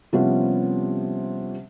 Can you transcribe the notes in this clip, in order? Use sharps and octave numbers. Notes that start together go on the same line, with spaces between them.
C3 F3 G3 B3 C#4